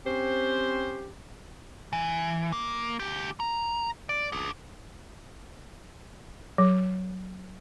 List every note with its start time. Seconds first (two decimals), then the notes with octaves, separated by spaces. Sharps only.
0.06 C4 C#4 G4 C5
1.93 E3
2.52 A#3
3.00 D2 G4
3.40 A#5
4.09 D5
4.32 D4 G#4
6.58 F#3